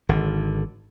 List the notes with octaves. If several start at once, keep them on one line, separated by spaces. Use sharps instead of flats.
G#1 D3